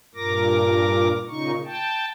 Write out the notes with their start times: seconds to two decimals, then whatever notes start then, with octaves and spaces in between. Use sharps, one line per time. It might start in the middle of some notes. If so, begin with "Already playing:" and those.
0.15 G2 A#2 A#4 D6 A#6
1.28 A#2 C#3 D#4 C#6
1.65 G5 A5